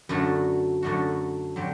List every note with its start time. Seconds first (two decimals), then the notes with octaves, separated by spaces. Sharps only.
0.09 F#2 D3 A3 D4 F#4
0.83 F#2 D3 A3 D4 F#4
1.56 D3 F#3 C4 G4